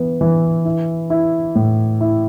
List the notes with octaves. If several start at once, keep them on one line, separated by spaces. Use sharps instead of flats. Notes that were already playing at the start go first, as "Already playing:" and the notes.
Already playing: E3 B3
E3
E4
E4
A2
E4